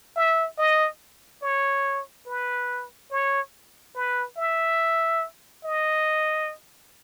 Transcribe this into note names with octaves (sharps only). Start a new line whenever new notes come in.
E5
D#5
C#5
B4
C#5
B4
E5
D#5